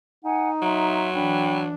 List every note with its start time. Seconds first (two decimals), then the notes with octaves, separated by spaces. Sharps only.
0.24 D#4 F#5 G#5
0.62 F#3 E5 A#5 C6
1.14 E3 D4 G5 B5